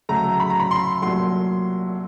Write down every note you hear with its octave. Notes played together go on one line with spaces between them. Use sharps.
D2 C#3 F#3 A3 A#5
B5
A#5
B5
C6
C2 A#2 F#3 A3 C6